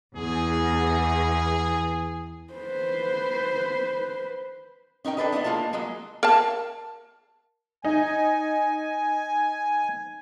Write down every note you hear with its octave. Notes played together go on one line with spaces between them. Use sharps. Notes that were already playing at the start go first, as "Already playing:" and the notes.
E2 G#4
B4 C5
C#4 D#4 A#4 G5
D4 A4 B4 D#5
G#3 B3 E4 D#5
A2 G#3 A#3 F4 C#5 A5
F#3 G#3 A#3 D#5
A#4 F5 A5
D#4 G#5